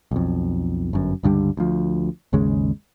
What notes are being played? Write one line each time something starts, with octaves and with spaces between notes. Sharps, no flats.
B1 F2
G1 F#2
C#2 G2 D3 G3
D2 F3
G#1 D#2 C#3 G#3